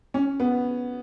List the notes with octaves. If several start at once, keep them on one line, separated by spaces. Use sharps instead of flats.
C#4
B3